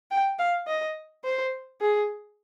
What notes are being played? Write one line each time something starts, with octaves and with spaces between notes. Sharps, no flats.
G5
F5
D#5
C5
G#4